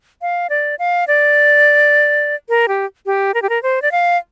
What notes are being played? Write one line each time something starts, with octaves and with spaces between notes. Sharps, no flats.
F5
D5
F5
D5
A#4
G4
G4
A#4
G4
A#4
C5
D5
F5